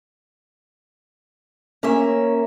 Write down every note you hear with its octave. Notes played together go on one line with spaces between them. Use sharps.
A#3 C#4 A#4 E5